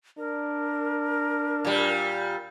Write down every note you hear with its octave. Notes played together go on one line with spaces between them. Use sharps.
D4 A#4
A#2 G3